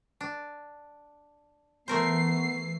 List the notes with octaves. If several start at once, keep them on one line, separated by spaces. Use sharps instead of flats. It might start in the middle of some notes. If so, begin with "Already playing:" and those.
D4
E3 A3 B3 A#4 C5 C7